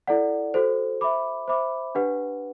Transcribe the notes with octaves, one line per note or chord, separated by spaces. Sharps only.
E4 A4 D5 F#5
F#4 A4 C5
C5 E5 B5 D6
C5 E5 B5 D6
D4 G4 B4 F#5